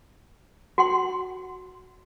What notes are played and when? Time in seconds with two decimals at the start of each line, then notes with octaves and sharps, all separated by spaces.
0.78 F#4 F#5 C6